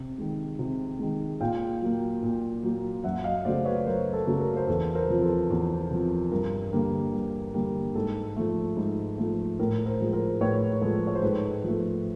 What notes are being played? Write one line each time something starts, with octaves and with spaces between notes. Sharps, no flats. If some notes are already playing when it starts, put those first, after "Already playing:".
Already playing: C3
D#3 G#3
C3
D#3 G#3
A#2 F5 G5
F#3 A#3
A#2
F#3 A#3
F#2 E5 F#5
D#5 F5
C#3 F#3 A3 C5 D5
B4 C#5
F#2 A#4 C5
A4
C#3 F#3 A3
A#4
C5
E2 A4 B4
A#4 C5
C3 F3
A4 B4
E2
C3 F3
G2 A#4
D3 G3 A#3
G2
D3 G3 A#3
G#2 A4
F3 A3
G#2
F3 A3
A2 A#4
A#4 C5
F3 G#3
A#4 C5
A2 B4 C#5
F3 G#3 A4 B4
C#5
C5
G#2 A4 B4
F3 A3